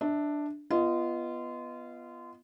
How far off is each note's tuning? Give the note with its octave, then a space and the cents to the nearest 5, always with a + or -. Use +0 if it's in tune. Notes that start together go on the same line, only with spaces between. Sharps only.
D4 +5 E5 -25
B3 +0 F4 -25 D#5 +0